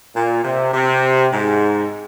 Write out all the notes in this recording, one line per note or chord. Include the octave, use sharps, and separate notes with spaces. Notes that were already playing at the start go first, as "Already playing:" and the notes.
A#2
C3
C3
G#2